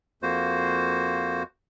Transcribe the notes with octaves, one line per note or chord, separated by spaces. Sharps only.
F2 A#3 F#4 C5